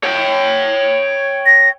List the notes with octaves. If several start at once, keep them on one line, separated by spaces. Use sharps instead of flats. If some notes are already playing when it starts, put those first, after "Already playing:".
C#5 G5
A#6